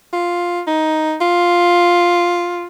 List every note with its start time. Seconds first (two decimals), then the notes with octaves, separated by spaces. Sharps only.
0.13 F4
0.67 D#4
1.21 F4